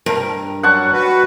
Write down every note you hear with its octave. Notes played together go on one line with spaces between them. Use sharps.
G2 A#4
F#3 G3 F#5 A5 C#6
F#4 B4